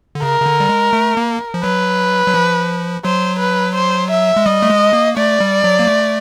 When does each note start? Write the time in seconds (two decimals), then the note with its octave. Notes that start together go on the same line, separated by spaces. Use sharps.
0.15 D3
0.22 C#3 A#4
0.40 C#3
0.46 D3
0.60 G3
0.69 G#3
0.93 A3
1.17 A#3
1.54 F3
1.64 F#3 B4
2.26 F#3
2.34 F3
3.05 F#3 C5
3.40 B4
3.75 C5
4.11 E5
4.36 G#3
4.46 G3 D#5
4.62 A3
4.70 G#3
4.93 A#3
5.17 A3 D5
5.40 G3
5.64 F#3
5.79 A#3
5.87 A3